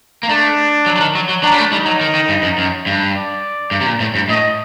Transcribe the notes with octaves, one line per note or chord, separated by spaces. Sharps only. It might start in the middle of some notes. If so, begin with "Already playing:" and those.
A#3
A3 D4
F#3
F#3
D#3
F#3
F#3
F#3 D4
G3
A3
G3 D#4
F#3
D#3
D#3
G2
F#2
F#2
G2
D5
G2
C3
A#2
A2
G2
A2 D#5